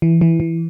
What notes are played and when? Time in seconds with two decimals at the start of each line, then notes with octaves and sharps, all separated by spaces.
0.02 E3
0.21 E3
0.40 E3